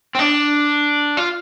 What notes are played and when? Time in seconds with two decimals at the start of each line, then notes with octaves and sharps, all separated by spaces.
0.15 C4
0.19 D4
1.17 F4